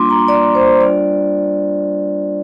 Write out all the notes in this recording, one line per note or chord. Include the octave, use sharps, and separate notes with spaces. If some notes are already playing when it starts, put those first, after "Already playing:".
Already playing: G3 A#3 D4 F4 C6 D6
A#5
D5
C5
G3 D4 F4 D5